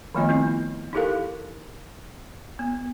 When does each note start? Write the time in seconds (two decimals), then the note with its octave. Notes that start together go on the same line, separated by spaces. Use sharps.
0.15 D#3 F3 A3 B3 F4 D#5
0.29 C4 E4
0.93 D#4 E4 G4 A4 A#4 F5
2.59 B3